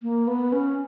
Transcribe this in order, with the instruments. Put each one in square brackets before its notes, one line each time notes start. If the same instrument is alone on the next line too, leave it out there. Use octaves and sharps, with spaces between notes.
[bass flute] A#3
B3
C#4